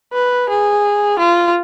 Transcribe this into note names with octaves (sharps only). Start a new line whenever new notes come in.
B4
G#4
F4